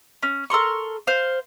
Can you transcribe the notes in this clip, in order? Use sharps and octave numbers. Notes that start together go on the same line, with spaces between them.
C#4
A4 A#4 C6 C#6
C5 F5